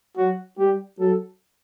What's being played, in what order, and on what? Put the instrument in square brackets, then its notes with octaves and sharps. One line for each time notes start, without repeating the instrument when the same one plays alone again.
[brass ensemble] F#3 [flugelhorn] F#4
[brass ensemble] G3 [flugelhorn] G4
[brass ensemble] F#3 [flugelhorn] A4